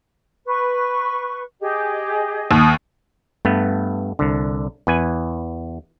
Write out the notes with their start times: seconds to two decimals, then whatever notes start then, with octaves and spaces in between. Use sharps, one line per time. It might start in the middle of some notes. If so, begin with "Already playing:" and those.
0.45 B4 C#6
1.60 G4 G#4 D#5
2.51 D#2 D#6
3.45 G2 A3 B3
4.19 C2 D3
4.87 E2 B4 G#5